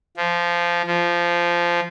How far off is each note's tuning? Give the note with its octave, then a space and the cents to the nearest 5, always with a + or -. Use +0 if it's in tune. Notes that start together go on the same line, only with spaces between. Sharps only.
F3 -15
F3 -15